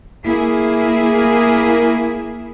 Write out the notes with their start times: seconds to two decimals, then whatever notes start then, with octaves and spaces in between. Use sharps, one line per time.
0.24 A#3 E4 G#4